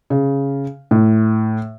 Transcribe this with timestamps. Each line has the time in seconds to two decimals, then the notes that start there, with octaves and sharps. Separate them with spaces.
0.10 C#3
0.91 A2